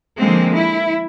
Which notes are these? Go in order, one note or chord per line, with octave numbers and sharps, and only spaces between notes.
D3 F3 G#3 A#3 C4
E4